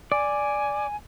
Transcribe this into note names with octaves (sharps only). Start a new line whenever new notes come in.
D5 G#5